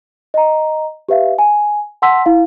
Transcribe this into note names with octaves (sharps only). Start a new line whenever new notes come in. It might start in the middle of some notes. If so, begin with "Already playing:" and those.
D#5 A#5
G4 B4 E5 F5
G#5
F#5 A5 C6 E6 B6
E4 F5